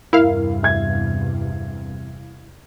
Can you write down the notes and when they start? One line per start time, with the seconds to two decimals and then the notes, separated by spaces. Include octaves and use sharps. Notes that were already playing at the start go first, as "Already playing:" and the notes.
0.13 E2 G2 C3 E4 A#4 F5
0.63 E5 G#6